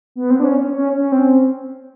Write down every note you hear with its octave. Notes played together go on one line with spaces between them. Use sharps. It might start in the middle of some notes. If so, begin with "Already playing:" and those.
B3
C4
D4
C#4
C#4
C#4
C#4
C4